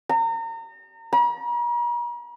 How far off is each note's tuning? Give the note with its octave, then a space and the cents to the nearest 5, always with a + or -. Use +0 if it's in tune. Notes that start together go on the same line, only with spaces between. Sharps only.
A#5 -35
A#5 +45